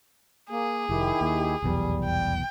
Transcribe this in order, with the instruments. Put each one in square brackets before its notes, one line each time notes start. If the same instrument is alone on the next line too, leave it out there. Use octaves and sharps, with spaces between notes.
[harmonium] A#3 [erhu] G#4
[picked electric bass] F1 [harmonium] D#3 E4 G4
[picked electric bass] D#2
[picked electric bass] F1 B1 E2 [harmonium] G3
[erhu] G5